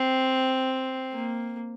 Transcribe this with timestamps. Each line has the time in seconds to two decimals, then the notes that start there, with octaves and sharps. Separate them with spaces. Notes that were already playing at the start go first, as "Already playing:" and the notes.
Already playing: C4
1.13 A#3